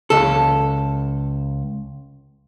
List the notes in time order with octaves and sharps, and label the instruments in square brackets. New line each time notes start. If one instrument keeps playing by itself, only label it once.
[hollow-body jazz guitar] C#2 A4